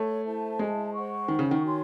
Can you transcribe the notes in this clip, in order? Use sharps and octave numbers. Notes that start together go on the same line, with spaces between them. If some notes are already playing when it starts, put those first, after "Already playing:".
Already playing: A3 C#5
E4 C5 E5 A5
G#3
C5 F#5 C#6
D#3
C#3
D#3
F#4 C#5 G#5 C6